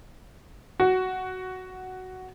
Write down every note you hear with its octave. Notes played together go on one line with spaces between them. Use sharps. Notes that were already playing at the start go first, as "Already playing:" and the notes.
F#4